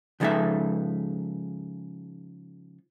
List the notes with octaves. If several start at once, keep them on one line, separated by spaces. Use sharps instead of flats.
C#3 F3 G#3 D#4 A4 E5